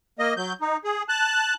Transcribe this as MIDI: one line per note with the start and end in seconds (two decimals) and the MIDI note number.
0.19 0.34 58
0.19 0.34 75
0.37 0.53 54
0.37 0.53 91
0.61 0.77 63
0.84 1.03 68
1.09 1.54 81
1.09 1.54 90